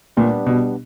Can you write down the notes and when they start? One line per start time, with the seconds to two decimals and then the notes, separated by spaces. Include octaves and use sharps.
0.17 A#2 G3 B3 D4 G4
0.46 B2